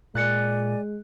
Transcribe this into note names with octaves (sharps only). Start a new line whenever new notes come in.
A#2 G#3 D5 G#5 F#6 A6 C#7